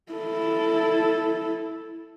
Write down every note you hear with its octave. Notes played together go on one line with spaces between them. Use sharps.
E4 A4